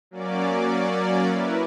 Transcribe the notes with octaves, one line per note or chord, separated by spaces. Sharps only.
F#3 A#3 C#4 D5
E4 A#4 B4